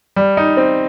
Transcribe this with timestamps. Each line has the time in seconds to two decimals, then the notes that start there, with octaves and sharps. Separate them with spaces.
0.16 G3
0.37 D#4
0.57 C4